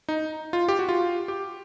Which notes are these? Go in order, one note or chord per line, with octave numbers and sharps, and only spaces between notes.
D#4
F4
G4
F#4
F4
G4